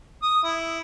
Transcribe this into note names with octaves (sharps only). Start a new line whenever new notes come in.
D#6
E4